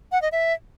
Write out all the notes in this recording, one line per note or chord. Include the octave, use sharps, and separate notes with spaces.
F#5
D#5
E5